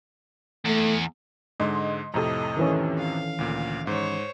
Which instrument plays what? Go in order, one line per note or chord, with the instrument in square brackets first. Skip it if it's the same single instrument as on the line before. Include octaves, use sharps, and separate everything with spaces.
[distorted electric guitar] E2 [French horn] A3
[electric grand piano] G#2 D3 G#3 [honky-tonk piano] D#5 C6
[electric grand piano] F2 A2 C3 [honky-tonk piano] A4 A#5 [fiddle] D#5
[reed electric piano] D#3 E3 C#4
[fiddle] F5
[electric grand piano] D2 A#2
[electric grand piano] G#2 [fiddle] C5 C#5